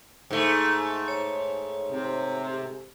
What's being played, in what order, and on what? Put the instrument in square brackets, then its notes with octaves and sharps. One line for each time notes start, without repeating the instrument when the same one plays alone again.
[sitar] G#2 A3
[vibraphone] C#5
[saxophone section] C3